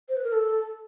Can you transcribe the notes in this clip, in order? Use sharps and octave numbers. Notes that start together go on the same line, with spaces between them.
C5
B4
A#4
A4